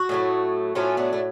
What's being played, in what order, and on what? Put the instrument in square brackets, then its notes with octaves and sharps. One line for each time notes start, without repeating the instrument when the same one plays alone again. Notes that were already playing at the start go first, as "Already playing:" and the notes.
Already playing: [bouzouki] F#4
A2 F#3 A3
A2 F#3 A3 C#4 F4
B3 D4
A3